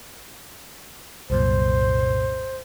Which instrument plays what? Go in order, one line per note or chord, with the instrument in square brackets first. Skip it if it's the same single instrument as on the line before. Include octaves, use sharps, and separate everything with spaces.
[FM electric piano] C2 F#2 A#2 [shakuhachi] C5